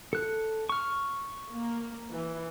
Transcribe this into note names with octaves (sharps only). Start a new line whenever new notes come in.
A4 F#6
C#6 F6
A#3
E3